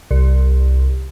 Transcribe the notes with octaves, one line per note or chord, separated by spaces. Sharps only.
C2